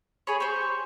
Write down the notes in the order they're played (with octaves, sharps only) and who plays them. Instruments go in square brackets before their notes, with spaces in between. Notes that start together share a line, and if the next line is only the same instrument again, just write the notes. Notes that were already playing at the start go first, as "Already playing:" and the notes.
[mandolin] G#4 C#5 [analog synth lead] B5
[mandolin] G4 C5 [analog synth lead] C#6